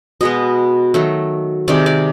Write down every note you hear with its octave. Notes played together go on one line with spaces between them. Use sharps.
B2 G#3 B3 D#5
D#3 F#3 A3
C3 D#3 G#3 D5
D5